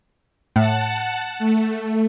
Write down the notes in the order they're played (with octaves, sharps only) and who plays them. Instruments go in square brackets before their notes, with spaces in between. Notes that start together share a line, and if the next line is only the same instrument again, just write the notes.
[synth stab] A2 [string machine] F#5 A5
[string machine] A3